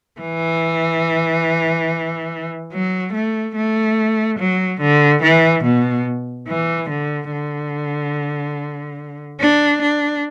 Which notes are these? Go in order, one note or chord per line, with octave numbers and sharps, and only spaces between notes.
E3
F#3
A3
A3
F#3
D3
E3
B2
E3
D3
D3
D4
D4